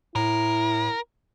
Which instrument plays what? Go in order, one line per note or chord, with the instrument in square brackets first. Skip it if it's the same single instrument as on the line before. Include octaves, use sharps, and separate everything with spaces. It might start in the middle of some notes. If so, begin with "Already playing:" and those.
[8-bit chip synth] A2 [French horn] E4 [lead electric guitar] A#4